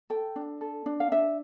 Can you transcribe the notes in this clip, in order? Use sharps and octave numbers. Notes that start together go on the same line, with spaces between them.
A4 G5
D4
A4
D4
F5
D4 E5